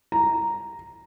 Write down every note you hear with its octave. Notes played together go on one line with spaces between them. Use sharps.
A#5